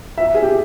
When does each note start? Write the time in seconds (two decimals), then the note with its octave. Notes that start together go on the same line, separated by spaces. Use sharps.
0.18 E5
0.34 G#4
0.43 G4